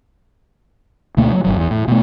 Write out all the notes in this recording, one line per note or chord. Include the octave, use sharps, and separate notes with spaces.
D2 B2 A3 A#3
F#3
G1 C2 F#3
E2
A2
B2 A3